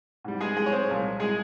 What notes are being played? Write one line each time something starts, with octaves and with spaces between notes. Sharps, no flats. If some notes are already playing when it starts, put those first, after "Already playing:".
G#2 G3
G#3 G#4
G#3 G#4
C#5
C4 C5
C2 A#2 F3 G#3
G#3 G#4